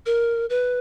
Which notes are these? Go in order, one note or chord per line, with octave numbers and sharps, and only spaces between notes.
A#4
B4